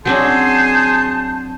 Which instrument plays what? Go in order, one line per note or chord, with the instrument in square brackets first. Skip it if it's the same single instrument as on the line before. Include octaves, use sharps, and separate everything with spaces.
[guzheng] F#3 C4 D4 [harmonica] G#4 A5 C6 [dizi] G6